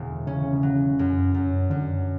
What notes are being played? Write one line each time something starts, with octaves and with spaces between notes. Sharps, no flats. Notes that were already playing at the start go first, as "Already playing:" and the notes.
Already playing: E1 D3
C#3 C#4
C#3
F#3
F#2
F#2
F#2 D3